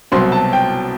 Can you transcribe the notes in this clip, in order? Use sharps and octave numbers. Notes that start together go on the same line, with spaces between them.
C2 B2 F#3 C4 C6
A5
G5